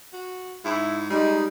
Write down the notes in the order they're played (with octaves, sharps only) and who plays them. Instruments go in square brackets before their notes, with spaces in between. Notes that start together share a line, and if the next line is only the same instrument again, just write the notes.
[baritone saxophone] F#4
[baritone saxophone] G#2 [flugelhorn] E4
[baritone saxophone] G3 [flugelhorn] G#3 [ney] D#4